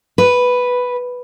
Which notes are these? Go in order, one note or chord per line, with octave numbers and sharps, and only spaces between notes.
B4